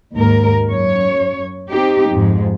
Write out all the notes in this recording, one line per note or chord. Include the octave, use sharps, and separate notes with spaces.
D#2 G#2 A#4
F#2 C#5
C4 D#4 G4
F2 G#2